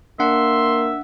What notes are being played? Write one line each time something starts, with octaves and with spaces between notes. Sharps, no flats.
A#3 D4 E5 F#5 C6